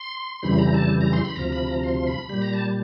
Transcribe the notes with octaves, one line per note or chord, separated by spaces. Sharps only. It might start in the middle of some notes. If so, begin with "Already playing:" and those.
Already playing: C6
F2 C#3 E3 G3 B5
A#5
A5
A#5
C6
B5
D2 C3 F3 A#5
B5
A#5
C6
B5
A#2 G3 B5
A#5
A5